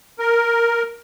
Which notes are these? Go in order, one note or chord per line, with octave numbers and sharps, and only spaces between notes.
A#4